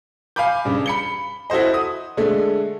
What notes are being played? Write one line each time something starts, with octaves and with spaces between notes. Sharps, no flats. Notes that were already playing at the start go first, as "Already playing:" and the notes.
F5 G#5 B5 D6 G6
G2 C#3
B5 C#7 G7
E4 F#4 A4 C5 D#5
D#6
D3 G#3 A3